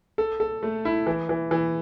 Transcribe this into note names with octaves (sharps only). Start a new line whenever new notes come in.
A4
A4
A3
E4
E3
E3
E3